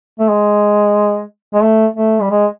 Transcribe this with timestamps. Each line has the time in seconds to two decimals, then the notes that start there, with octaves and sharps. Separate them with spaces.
0.20 A3
0.30 G#3
1.54 G#3
1.63 A3
1.96 A3
2.21 G3
2.31 G#3